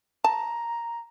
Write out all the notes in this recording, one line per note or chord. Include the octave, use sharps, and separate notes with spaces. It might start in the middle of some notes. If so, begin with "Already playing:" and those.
A5 A#5